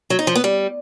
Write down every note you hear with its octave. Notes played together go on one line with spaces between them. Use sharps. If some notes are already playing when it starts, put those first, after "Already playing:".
F#3
D#4
F3
B3
G3